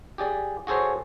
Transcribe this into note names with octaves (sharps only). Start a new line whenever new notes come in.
G4 G#4 D5
F#4 G#4 A4 C5 C#5